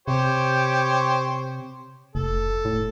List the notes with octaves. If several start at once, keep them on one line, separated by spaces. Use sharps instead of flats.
C3 G4 C5 C#5
F1 A4
A2